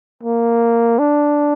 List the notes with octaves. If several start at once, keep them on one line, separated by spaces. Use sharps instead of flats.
A#3
D4